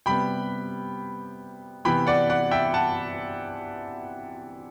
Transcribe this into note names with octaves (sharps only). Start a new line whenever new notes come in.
C3 G3 B3 G5 B5
C3 E3 B3 G5 B5
D5 F#5
D5 F#5
E5 G5
F#5 A5